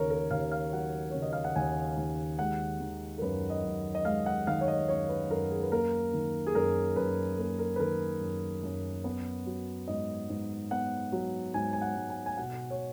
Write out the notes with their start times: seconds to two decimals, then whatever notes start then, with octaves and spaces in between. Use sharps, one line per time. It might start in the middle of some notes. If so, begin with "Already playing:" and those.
Already playing: D#2 C#3 A#4 C#5
0.10 A#4
0.31 D#2 F5
0.52 F5
0.72 F#3 F#5
1.10 C#3 C#5
1.22 D#5
1.33 F5
1.44 F#5
1.56 D#2 G#5
1.97 D#2
2.39 G#3 F#5
2.80 D#3
3.18 A#4
3.22 F#2 B4
3.50 D#5
3.64 F#2
3.95 D#5
4.05 G#3 F5
4.26 F#5
4.47 D#3 F5
4.61 C#5
4.68 D#5
4.88 F#2 C#5
5.09 B4
5.30 F#2 A#4
5.51 G#4
5.62 B4
5.71 A#3 A#4
6.13 D#3
6.47 G#4
6.55 F#2 A#4
6.96 F#2 B4
7.38 A#3 A#4
7.59 A#4
7.76 B4
7.79 D#3 A#4
8.21 F#2
8.63 F#2
9.04 B3
9.46 F#3
9.88 G#2 D#5
10.29 G#2
10.71 B3 F#5
11.12 F#3
11.54 G#2 G#5
11.73 G#5
11.81 F#5
11.96 G#2
12.10 G#5
12.26 G#5
12.37 B2 F#5
12.70 C#5